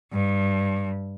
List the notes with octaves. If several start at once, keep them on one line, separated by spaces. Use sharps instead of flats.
G2